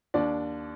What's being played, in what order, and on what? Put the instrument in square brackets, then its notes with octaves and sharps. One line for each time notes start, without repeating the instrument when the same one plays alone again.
[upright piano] D#2 D4 D5